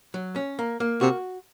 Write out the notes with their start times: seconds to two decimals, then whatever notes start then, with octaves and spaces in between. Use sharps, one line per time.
0.14 F#3
0.36 C#4
0.59 A#3
0.80 A#3
1.01 C3 F#4